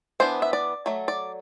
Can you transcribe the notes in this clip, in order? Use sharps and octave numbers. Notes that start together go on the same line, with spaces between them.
E3 B3 D4 C5
E5
D5
F#3 A3
D5